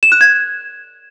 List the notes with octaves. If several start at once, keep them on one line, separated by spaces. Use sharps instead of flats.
E7
F#6
G#6